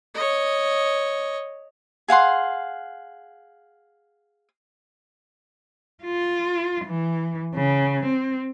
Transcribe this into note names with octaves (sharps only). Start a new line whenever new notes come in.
C#5 D#5
G#4 F5 F#5 C6
F4
E3
C#3
C4